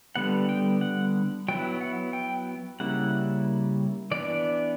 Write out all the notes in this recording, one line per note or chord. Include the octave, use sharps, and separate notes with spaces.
D3 G3 B3 F#5
G5
F#5
F#3 B3 E4 G5
F#5
G5
C#3 G3 A#3 E4 F#5
E3 B3 D4 D5